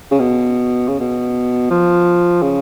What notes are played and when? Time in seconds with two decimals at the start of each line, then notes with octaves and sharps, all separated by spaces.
0.11 C#3
0.19 B2
0.88 C#3
1.00 B2
1.70 F3
2.42 C#3